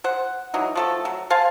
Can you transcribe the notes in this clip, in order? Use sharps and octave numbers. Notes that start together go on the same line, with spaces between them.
C5 F#5
E3 F#3 D#4
F3 A3 A4
F#3
C5 F5 G#5 A5